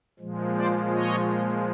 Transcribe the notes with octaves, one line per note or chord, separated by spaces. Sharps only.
A#2 F3 G#3
C5 D5
C#5 D#5